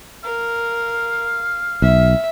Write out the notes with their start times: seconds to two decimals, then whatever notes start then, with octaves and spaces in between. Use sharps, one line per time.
0.24 A#4 F5
1.82 B1 E5